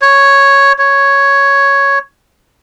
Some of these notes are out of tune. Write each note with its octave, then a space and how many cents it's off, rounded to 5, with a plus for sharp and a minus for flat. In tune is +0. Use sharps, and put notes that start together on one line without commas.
C#5 +0
C#5 +0